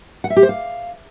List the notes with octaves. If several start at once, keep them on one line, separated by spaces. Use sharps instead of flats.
F#5
E5
G4
C5
F5